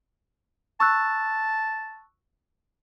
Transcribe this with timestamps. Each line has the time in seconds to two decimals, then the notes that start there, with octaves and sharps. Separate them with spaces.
0.80 A5 C#6 E6 F#6